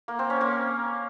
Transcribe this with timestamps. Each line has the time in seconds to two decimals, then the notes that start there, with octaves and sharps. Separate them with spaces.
0.08 A#3
0.19 C4
0.30 C#4
0.41 A#3